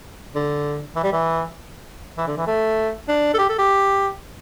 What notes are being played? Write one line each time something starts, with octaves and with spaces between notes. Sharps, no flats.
D3
E3
G3
E3
E3
D3
E3
A3
D4
A4
G4
A4
G4